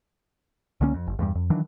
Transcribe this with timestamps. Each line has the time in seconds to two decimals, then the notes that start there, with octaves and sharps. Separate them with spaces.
0.81 C#2 D3 A#3 C#4
0.94 F2
1.07 G1
1.19 E2 G2 G3
1.35 F2
1.50 D#3 E3 F#3 D4